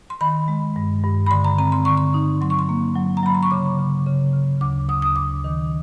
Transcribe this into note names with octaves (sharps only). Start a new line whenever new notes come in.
C6
D#3 B5
G#3
G2
G2
B5
D3 C6
A#5
C4 A#5
C6
D3 C#6
C6
D#4
F#3 C6
C#6
C6
A#3
F#3
A#5
F#3 B5
C6
C#6
C#3 D6
C#3
C#3
C#3
D2 D6
D2 D#6
D#6
D2 D6
D#3